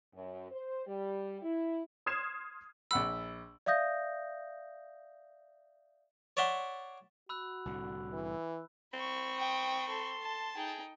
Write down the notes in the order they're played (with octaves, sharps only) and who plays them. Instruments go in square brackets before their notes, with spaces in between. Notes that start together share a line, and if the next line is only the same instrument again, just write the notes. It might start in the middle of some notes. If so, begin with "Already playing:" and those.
[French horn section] F#2
C5
G3
E4
[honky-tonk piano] C6 D#6 F6 G#6 C7 E7
[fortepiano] A#1 F#5 B5 [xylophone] E6
[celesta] D5 E5 F5 D#6 G6 A#6
[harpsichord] C#5 D5 E5 F#5 C6
[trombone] F#4 [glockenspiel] B5 E6 F#6
[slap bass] C2 A2 D3
[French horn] E3
[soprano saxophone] C4 [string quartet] B5 C#6
[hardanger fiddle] G5 D#6
A4 C6
[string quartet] A5
[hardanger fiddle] D#4 G5 [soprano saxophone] G#4